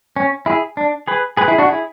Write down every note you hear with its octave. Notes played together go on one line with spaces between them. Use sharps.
C#4
E4 G#4
D4
G#4 B4
G#4 B4
E4 G#4
D4 F#4
E4 G#4